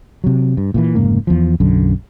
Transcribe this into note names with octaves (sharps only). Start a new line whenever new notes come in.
C3 F#3
G2
A#2 C#3 E3
F1 G#2 C#3 A#3
E2 F3
B1 F#2 D3